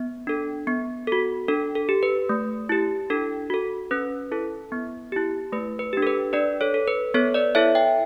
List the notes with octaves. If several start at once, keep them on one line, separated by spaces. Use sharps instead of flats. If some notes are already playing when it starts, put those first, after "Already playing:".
Already playing: B3
D4 A4
B3
F#4 A4
D4 A4
A4
G4
B4
A3
E4 G4
D4 A4
F#4 A4
C#4 B4
E4 A4
B3
E4 G4
A3 B4
B4
D4 G4
A4
B4
D4 B4 D5
A4 C#5
A4
B4
B3 A4 C#5
B4 D5
E4 A4 C#5 E5
E5 G5